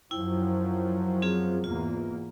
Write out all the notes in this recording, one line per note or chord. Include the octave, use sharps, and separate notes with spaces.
F#2 F3 F#3 E4 G5
C4 F4 G#4
E2 G#2 A#3 F4